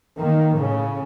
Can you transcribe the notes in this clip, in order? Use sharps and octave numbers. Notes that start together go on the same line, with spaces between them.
D#3 A#3
A2 C#3